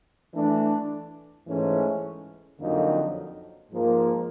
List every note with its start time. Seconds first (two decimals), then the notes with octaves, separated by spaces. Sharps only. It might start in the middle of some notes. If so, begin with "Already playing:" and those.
0.34 E3 A3 D4
1.47 G#2 E3 A3 C#4
2.60 F2 D3 F#3 A#3 D#4
3.72 G#2 F3 A#3